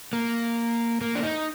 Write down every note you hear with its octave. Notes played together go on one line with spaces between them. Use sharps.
A#3
A#3
D4
D#4